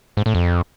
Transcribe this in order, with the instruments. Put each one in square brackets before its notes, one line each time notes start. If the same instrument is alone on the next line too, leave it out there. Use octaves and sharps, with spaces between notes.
[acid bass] G#2
A2
F2